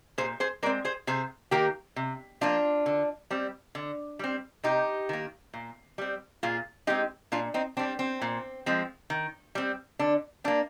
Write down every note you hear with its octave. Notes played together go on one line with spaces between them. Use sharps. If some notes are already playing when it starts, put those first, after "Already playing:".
A#2 G#4 C5
G#4 C5
G#3 C4 A#4 D5
G#4 C5
C3 G#4 C5
D#3 A#3 G4 A#4
C3
F3 A#3 D4 F4
D3
G3 C4
D3
G3 C4
C3 D#4 G4
D#3 A#3
A#2
G3 C4
A#2 F4 G#4
G#3 C4 D#4 G4
A#2 D4 F4
C4 D#4
G3 C4 D4
C4
A#2
F3 G#3 C4
D#3
G3 C4
D3 D4
G3 A#3 D4